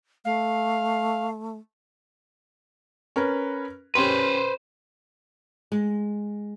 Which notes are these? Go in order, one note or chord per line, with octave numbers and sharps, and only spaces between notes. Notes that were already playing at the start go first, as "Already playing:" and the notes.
A3 F5
C#4 A#4 B4
C#4 G4 B4 C5 C6
G#3